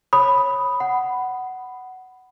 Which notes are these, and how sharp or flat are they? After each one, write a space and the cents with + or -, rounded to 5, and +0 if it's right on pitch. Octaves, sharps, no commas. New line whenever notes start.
C#5 -15 B5 +0 D#6 +0
F#5 +10 B5 +5